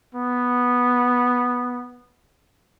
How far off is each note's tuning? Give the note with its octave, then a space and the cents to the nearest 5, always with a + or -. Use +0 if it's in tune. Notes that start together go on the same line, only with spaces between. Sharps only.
B3 -5